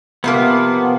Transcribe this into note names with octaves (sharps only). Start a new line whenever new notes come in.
C3 F3 A#3 B3